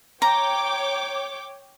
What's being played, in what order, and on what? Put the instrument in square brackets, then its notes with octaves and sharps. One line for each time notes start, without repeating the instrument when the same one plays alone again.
[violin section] C#5 G5 D6 [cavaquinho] A#5